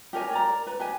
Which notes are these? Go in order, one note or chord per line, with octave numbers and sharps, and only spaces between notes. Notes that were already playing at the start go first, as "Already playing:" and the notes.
G4 A#4 C#5 G#5
A#4 D5 A#5
B4
G4 B4 G#5